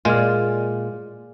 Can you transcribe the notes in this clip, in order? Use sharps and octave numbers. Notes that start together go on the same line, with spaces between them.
A#2 G#3 F4 G#4 D5 F6